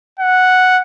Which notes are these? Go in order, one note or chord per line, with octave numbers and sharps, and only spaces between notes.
F#5